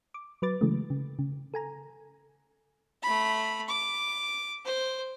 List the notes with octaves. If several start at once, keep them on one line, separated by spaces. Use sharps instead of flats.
D6
F#3 B4 D6 A6
C#3 E3 F#3 G#3 A3
C#3
C#3
A4 G#5 A#5
A3 B5
D6
C5